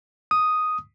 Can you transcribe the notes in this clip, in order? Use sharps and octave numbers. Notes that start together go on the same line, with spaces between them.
D#6